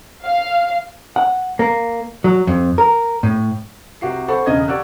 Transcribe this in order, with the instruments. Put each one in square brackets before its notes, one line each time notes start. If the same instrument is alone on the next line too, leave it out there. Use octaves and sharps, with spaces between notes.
[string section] F5
[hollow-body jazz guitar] F#5
A#3
F#3
F2
A#4
A2
[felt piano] C2 C3 F#4 G4 C7
A4 C5 F#5 B5 C#6
E1 C#3 D#5 D#6 G#6
G4 D5 F#5 C#6 E6 F#6